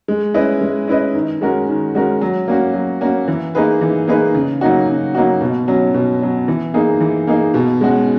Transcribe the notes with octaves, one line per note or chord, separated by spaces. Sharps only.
G#3
C#4 E4 B4 D#5
G#3
C#4 E4 B4 D#5
D#3
G#3 C#4 F#4 A#4
D#3
G#3 C#4 F#4 A#4
F#3
A#3 C#4 F#4
F#3
A#3 C#4 F#4
E3
A#3 D#4 G#4 B4
E3
A#3 D#4 G#4 B4
C#3
F#3 A#3 D#4 F#4
C#3
F#3 A#3 D#4 F#4
B2
F#3 C#4
B2
F#3 C#4
E3
A#3 D#4 G#4
E3
A#3 D#4 G#4
B2
G#3 C#4 F#4